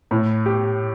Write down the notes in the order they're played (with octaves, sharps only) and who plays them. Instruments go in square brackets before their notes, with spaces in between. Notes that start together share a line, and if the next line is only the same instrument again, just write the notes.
[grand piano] A2
G4